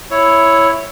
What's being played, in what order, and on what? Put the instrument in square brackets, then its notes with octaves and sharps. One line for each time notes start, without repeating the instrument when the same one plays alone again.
[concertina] E4 C#5